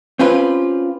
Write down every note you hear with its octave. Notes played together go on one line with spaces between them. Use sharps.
C4 C#4 F4 G4 B4